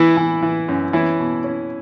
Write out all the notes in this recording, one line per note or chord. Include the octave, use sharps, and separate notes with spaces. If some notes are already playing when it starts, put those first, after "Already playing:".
Already playing: E3 E4
E3
E3
F#2
E3 C#4 E4
B2
C#4